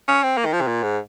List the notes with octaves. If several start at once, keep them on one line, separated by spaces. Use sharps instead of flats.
C#4
C4
A#3
D#3
F3
C3
A#2
G#2